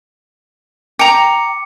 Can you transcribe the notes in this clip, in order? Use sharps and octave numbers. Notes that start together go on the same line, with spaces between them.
G5 A#5 D6 C#7